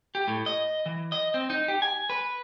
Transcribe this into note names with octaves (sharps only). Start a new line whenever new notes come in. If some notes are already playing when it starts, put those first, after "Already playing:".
G4
A2
D#5
E3
D#5
C4
D#4
G4
G#5
B4